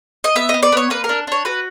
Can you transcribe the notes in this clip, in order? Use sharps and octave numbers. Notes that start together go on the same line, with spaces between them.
D#5
B3 E5
D#5
B3
D5
B3 C#5
A#3 B4
A#4
D4
D4 C#5
F#4 B4